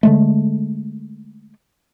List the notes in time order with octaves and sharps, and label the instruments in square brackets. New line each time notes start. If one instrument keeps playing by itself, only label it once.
[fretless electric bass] D3 G#3 A3